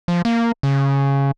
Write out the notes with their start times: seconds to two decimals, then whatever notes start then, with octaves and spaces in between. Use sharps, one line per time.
0.08 F3
0.25 A#3
0.63 C#3